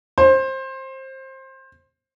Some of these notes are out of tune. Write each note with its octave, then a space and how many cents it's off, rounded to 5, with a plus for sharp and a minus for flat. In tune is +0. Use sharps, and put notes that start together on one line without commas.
C5 +20